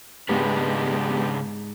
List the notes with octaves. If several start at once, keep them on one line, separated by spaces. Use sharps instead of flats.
G#2 C#3 G#3 B3 D4 G4 B4